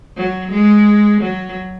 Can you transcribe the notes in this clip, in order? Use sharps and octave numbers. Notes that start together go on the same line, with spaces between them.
F#3
G#3
F#3